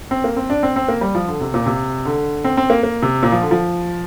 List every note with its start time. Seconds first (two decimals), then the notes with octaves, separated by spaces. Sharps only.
0.11 C4
0.24 A#3
0.37 C4
0.50 D4
0.63 C4
0.76 C4
0.88 A#3
1.01 G3
1.15 F3
1.28 D3
1.41 C3
1.54 A#2
1.66 C3
2.05 D3
2.44 C4
2.57 C4
2.70 A#3
2.83 A#3
3.02 C3
3.23 A#2
3.32 F3
3.42 D3
3.51 F3